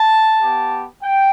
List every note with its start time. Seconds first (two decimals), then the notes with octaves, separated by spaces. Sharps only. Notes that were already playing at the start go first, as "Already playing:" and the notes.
Already playing: A5
0.42 B3 G4
1.03 G5